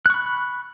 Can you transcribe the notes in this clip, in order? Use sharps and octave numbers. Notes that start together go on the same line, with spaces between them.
B5 C#6 F#6